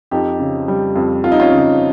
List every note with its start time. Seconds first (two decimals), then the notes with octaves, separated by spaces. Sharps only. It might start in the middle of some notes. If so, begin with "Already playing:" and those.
0.11 F2 D#4 G4
0.39 C#3
0.68 G3
0.95 F2
1.24 F2 F4
1.32 D#4
1.40 C#4 F4
1.52 C#3